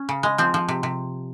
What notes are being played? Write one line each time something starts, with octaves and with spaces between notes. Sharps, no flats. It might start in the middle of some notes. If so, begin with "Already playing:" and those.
Already playing: C#4
C#3
G#3
F3 C4
F3
C3
C3